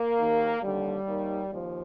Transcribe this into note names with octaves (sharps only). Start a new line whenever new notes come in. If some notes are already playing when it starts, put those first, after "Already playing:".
Already playing: A#3
D#2 D#3
D#2 D3 G3
D#2 D#3
D#2 F3